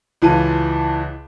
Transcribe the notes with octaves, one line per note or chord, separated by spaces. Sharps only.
C#2 E3 F4 A5 D#7